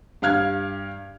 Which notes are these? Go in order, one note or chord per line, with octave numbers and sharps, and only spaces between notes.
G2 F5 F6 G#6